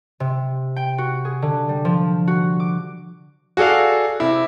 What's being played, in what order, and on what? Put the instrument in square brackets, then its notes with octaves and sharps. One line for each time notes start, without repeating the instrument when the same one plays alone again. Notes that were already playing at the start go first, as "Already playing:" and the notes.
[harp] C3
G5
F#4
G#4
D3
G3
F3
F#4
D6
[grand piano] F#4 G#4 A4 D5 F5
C3 E4